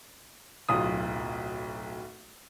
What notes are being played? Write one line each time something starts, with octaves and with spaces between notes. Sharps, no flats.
D1 B1 F4 D#6